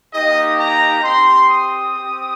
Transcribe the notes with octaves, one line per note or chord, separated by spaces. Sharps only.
A#3 D#4 G4 D#5
A#5
C4 G4 C6
D#6
C4 G4